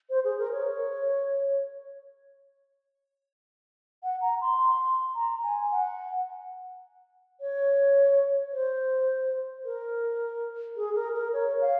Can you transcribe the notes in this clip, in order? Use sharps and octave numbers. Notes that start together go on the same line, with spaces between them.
C5
G#4
A#4
C#5
F#5
A#5
C6
A#5
G#5
F#5
C#5
C5
A#4
G#4
A#4
A#4
C#5
F5